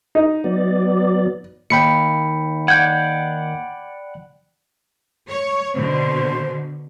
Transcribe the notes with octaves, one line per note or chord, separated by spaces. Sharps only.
D#4
F#3 B3 D5
D#2 G5 B5 C#7
D5 F#5 G6 G#6
C#5
B2 D3 C5